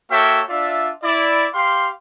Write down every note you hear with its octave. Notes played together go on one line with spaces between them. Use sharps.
A#3 F#4 A4 C#5 E5 G5
D4 F4 D5 E5
E4 D5
G4 F5 C6